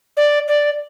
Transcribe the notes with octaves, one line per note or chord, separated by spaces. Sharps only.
D5
D5